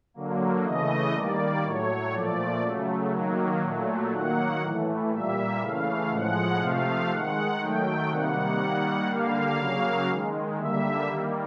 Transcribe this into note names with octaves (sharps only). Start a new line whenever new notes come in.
D3 F#3 A#3
C#3 E3 A3 D#5
D#3 G3 A#3 D5
A2 F#3 A3 C#5
A#2 F3 A3 D5
C#3 F#3 A3
D#3 F#3 A#3
A#2 F#3 A3
D#3 F#3 A#3 F#5
A2 E3 A3
A#2 G3 A#3 E5
C#3 E3 A3 F5
A2 F3 G#3 F#5
C3 F3 A3 F5
D#3 G#3 F#5
D#3 F#3 A3 G5
C3 D#3 G3 A#3 F#5
D#3 G3 A#3 F#5
D3 G3 A#3 F5
C#3 F#3 A#3 F5
D#3 G#3
D3 G3 A#3 E5
D#3 G3 A#3